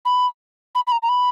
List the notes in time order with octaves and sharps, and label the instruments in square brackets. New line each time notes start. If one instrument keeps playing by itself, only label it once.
[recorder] B5
B5
B5
A#5
A#5
B5